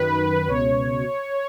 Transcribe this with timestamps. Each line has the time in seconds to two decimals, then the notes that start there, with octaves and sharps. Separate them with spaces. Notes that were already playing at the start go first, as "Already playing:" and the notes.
Already playing: F#2 D#3 B4
0.48 C#2 B2 C#5